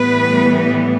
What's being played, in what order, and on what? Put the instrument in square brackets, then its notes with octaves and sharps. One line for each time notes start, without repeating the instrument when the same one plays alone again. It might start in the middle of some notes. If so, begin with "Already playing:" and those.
Already playing: [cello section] A2 E3 G3 B3 B4